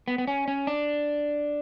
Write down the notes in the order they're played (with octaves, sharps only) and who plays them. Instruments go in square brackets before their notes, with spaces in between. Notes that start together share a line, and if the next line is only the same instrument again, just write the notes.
[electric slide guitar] B3
B3
C#4
C#4
D4